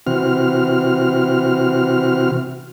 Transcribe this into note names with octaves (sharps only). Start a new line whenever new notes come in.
C3 E3 C4 F#4 F6